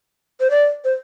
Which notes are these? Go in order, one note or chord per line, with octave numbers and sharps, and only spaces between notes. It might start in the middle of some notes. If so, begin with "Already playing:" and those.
C5
D5
C5